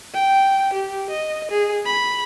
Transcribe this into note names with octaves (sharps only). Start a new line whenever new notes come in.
G5
G4
D#5
G#4
B5